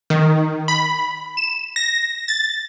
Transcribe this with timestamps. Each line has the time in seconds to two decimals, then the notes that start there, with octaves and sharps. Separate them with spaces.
0.10 D#3
0.68 B5
1.37 E7
1.76 A#6
2.28 A6